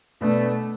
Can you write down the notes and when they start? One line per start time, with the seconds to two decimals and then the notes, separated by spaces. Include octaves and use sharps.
0.21 B2 A3 B3 D4